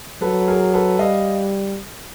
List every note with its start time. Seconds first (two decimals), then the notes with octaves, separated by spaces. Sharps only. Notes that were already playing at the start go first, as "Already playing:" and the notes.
0.21 F#3 A4 B4
0.48 G#4 A#4
0.74 A4 B4
0.99 G3 D#5 F5